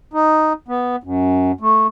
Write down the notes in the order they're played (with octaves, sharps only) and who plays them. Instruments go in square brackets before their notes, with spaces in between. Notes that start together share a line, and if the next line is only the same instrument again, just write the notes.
[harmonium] D#4
B3
F#2
A3